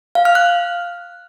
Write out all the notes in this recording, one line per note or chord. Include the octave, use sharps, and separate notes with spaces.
F5
F6
F#6